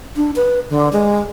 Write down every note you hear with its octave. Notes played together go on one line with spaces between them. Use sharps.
D4
B4
D3
G#3